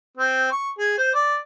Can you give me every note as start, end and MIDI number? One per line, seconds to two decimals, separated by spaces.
0.17 0.51 60
0.52 0.70 85
0.78 0.97 68
0.98 1.13 72
1.14 1.37 74